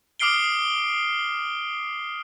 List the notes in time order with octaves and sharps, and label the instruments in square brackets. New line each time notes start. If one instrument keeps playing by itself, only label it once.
[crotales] D6 D#6 F6 C7 D7 G7